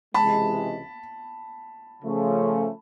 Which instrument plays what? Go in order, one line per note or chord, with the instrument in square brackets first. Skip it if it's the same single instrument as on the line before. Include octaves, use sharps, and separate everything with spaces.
[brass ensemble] C#2 C3 E3 G#3 [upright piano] A5 B5
[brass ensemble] C#3 F3 A3 C#4